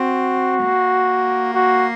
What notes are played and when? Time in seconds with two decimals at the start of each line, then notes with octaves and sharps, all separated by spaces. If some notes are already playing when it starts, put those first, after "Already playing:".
Already playing: C4 F#4
0.63 A#3
1.55 F#4